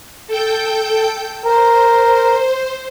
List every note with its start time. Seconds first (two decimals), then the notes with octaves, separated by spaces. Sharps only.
0.28 A4 G5 G6
1.45 A#4 C5